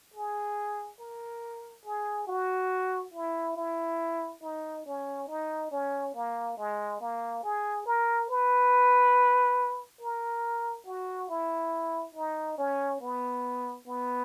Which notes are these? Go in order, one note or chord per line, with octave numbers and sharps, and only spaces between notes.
G#4
A#4
G#4
F#4
E4
E4
D#4
C#4
D#4
C#4
A#3
G#3
A#3
G#4
A#4
B4
A#4
F#4
E4
D#4
C#4
B3
B3